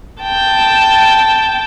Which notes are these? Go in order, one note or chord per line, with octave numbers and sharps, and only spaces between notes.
G5 A5